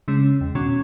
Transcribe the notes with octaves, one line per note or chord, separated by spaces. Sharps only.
C#3 G#3 C#4
E2
B2 D#3 C#4 F#4 C#6 G#6